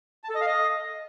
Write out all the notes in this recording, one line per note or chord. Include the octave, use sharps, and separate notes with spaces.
A5
A4
D#5
F5
D#5